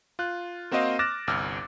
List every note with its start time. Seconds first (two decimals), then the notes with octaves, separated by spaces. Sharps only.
0.19 F4 F#6
0.71 A#3 C4 F#4 C5 D#5 F5
0.99 D6 F6 F#6 A6 A#6 E7
1.27 G1 C2 D6 E6 F6 A#6